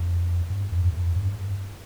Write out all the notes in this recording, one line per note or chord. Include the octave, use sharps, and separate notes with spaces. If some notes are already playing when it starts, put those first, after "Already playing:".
Already playing: F2
G2
F2
F2
G2